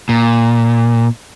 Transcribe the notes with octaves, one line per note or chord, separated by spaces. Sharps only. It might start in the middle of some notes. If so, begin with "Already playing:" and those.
A#2